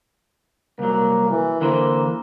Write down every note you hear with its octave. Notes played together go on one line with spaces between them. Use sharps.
C2 F#3 A#3
E3
D3 E3 A#3 C5